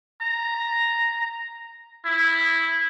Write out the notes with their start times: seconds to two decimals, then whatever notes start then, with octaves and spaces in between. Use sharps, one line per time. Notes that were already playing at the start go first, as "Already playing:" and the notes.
0.22 A#5
2.05 E4